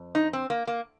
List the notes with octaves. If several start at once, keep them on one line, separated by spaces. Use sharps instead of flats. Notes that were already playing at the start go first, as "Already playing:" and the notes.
Already playing: F2
D#4
C4
A#3
A#3